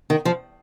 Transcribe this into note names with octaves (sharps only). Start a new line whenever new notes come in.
D#3
F3